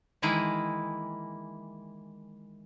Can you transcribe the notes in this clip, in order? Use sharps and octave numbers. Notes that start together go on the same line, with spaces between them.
D#3 E3 G#3 A#3 E4